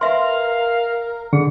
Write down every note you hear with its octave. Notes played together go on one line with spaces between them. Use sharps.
A#4 B4 E5 F5 C6
D3 G#4